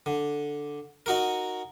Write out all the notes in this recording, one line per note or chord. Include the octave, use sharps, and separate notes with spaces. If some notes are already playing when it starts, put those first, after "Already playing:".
D3
D#4 F#4 A#4